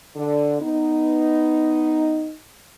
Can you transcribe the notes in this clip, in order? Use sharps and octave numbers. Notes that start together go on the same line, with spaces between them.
D3
B3 D#4